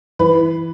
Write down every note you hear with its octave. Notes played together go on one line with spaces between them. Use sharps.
E3 B4